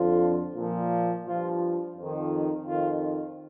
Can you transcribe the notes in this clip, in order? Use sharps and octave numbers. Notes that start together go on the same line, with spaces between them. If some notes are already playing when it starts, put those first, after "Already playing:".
Already playing: F2 D3 F3 F4
A#2 F3
G2 F3 F4
F2 D#3
F2 D#3 F4